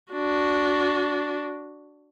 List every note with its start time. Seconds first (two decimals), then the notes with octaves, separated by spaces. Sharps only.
0.12 D4 F#4